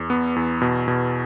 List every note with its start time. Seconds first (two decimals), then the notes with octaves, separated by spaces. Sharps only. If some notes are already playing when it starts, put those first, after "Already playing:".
Already playing: E2
0.10 B3
0.36 E2
0.61 B2
0.88 B2